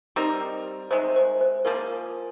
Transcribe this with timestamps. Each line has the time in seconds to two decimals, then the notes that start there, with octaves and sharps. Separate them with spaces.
0.16 G3 C4 D#4 A#4
0.91 C3 D#3 G#3 C5
1.16 C5
1.41 C5
1.65 F3 A#3 F4 G#4 A#4